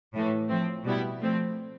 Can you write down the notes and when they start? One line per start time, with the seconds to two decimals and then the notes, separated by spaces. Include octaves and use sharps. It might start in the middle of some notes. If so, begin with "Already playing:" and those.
0.13 A2 E3 A3
0.49 A2 F3 C4
0.84 B2 G3 B3 E4
1.20 F3 A3 C4